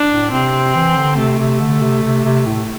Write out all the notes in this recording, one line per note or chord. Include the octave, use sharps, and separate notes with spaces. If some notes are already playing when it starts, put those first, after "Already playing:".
Already playing: D4
A2
C3 C4
E3
D3
C3 A3
C3
D3
C3
C3
C3
A2